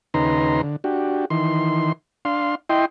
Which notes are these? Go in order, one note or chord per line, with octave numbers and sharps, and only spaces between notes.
D#2 C#3 D#4 B4 A#5 C6
D3
D4 F#4 G4
D#3 E3 C6
D4 F5 C6
E4 D#5 G5 C6